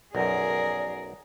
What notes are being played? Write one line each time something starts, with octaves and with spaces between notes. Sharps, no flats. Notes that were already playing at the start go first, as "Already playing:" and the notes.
B1 F#2 G#4 A#4 D5